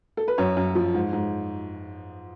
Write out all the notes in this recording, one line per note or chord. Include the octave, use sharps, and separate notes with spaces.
A4
B4
F#2 C#5
F#2
F3
G#2
G#2